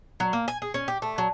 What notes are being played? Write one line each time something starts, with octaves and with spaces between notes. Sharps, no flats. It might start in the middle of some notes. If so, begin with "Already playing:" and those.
F#3
A#3
G#5
G#4
C#4
G4
A3
F#3